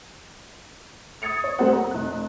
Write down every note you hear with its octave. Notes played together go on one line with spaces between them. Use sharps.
D#6 G#6 A6 C#7 F7
C#5
G3 A3 A#3 C4 C5 F#5
A#5
F1 F#6